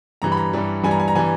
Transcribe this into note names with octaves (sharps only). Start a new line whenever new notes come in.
G2 E3 G3 A#5
B5
A#5
G2 E3 G3
G2 E3 G3 G#5
A#5
G#5
A#5
E3 G3 G#5